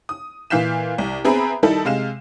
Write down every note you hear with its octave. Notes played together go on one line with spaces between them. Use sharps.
D#6
A#2 E3 F5 G6 B6 E7
C2
B3 C4 G#4 E5 A#5 B5
D#3 G3 D#4 E4 A4
C3 G#3 F5 E7